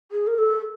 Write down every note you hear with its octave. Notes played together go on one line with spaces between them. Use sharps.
G#4
A#4
A4